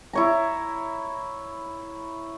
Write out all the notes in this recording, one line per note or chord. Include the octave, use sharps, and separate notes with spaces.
E4 C#5 A#5